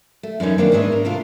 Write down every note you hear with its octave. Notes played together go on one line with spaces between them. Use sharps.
A3
F#2 E3 C#4 D#4
D#3 A#3 C4 D4 B4 C#5
G#2 B3 C#4 D4 D#5 E5
A#4
A2 C3 A3 D4 F4